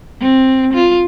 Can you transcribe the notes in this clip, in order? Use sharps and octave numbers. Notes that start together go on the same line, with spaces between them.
C4
F4